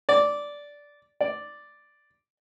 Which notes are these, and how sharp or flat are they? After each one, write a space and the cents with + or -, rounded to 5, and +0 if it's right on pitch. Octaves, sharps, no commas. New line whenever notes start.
D5 -10
D5 +0